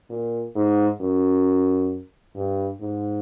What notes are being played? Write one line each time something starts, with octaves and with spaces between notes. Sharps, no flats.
A#2
G#2
F#2
G2
G#2